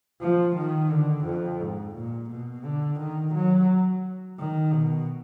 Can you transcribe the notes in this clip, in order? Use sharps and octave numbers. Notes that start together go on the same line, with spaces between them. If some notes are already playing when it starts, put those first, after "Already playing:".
F3
D#3
D3
F2
G#2
A#2
B2
D3
D#3
F#3
D#3
B2